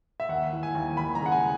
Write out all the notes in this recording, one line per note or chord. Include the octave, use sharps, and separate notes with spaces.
E5
D#2 F#5
E3
G#5
D#2
D#2 B5
A#5
C#3 F#5
G#5